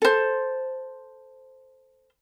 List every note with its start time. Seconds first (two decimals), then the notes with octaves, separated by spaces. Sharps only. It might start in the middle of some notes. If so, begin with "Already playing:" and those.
0.02 A4 C5